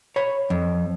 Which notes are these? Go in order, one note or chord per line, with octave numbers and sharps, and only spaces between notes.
C#5 B5
F2